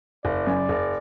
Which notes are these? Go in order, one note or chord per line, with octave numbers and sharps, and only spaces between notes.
F#1 D5
F#2 C#3
F#1